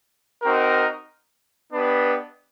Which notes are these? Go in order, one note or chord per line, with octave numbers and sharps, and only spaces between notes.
C4 D#4 F#4 A#4
B3 D4 G4 B4 D#5